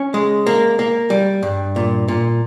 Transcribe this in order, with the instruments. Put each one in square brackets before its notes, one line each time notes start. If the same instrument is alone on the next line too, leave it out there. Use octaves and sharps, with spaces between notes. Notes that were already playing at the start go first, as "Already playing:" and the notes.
Already playing: [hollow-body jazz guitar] C#4
G#3
A#3
A#3
G3
G2
A#2
A#2